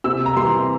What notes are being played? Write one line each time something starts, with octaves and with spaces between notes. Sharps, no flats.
C3 E6
A#5
E3 G3 C6